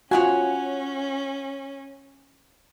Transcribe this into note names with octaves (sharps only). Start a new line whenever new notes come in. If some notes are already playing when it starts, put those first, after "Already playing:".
C#4 F4 F#4 C#5 F#5 G#5